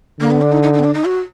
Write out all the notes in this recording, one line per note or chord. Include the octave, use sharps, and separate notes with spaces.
D3 A#3
B3
D4
D#4
D#4
D#4
B3
D4
D#4
F#4